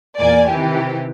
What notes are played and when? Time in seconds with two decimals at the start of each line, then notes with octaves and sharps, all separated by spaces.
0.20 E2 A#2 A#3 D5 G#5
0.49 C3 D#3 E3 G4